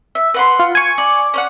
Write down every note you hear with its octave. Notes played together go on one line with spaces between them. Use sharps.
E5
B4 F#5 C6
F4
G#5 C#6
D5
C#4 D5 F#5